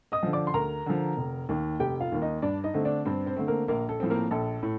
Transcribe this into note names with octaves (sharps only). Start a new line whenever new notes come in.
D#5 D#6
D3 F3
D5 D6
C6
D2 A#4 A#5
D3 F3
F1
D#2 D#3 A#3
F1 G4 G5
F4 F5
D#2 D#3 A#3
D#4 D#5
G2 D4 D5
D#4 D#5
D3 A3 C4
D4 D5
G2 C4 C5
C4 C5
D3 A3 C4
A#3 A#4
A#1 A#3 A#4
A4
A2 F3 C4
A#3 A#4
A#1 A4
A2